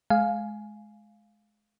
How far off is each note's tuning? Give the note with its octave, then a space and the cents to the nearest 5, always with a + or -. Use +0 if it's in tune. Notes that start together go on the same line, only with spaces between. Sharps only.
G#3 +25 F5 +0 G#5 +10